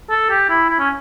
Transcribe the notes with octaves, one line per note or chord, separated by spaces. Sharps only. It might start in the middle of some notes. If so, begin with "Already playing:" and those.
A4
G4
E4
E4
C#4